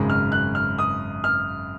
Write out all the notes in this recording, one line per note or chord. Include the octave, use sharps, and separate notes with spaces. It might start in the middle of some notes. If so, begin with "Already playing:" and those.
Already playing: G#1 F#2 C#3 G#3
F6
F#6
F6
D#6
F6